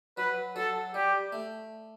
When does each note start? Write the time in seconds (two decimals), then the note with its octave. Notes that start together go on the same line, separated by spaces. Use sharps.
0.17 F#3 B4
0.56 F#3 A4
0.94 G3 G4
1.32 A3